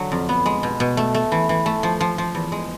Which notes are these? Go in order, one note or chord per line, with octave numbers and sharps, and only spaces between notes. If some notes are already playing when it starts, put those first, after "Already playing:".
Already playing: D3 F#3
F2
B3
G#3
B2
B2
A3
A3
E3
E3
A3
F3
F3
F3
E2
G#3